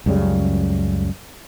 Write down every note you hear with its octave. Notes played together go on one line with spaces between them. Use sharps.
C#2 F#2 C#3 G3